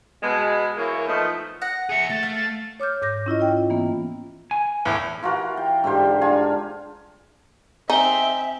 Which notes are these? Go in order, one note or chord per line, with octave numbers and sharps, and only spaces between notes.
B2 G#3 B3
E3 A#3 C#5
F3 A3 B3 D#4 D#5
F#5 A#6
G#4 E5 C#7
A3 A6
F5
A6
C#5 D6 F6 G6
G#2 D6 G6 A#6
C#4 E4 F4 D#5
C#4 F4 D#5 G5
E3 A#3 B3
G#5
E2 A2
E3 F4 F#4 A#4
G5
G#2 D3 G4 C5
D4 F4 G#5
C4 D#4 E5 G#5 G7